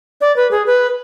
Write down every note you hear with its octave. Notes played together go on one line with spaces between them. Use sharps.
D5
B4
G#4
B4